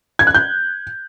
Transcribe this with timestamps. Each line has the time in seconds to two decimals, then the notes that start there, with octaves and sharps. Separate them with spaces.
0.19 G#6
0.27 F#6
0.34 G6